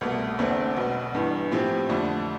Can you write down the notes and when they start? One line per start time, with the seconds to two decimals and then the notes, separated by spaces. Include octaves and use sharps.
0.01 C2 B2 A3
0.39 E1 E2 D3 A3 C4
0.76 B1 B2 B3
1.14 G1 G2 E3
1.51 A2 F3 C4 G4
1.89 F2 D3 F3 A3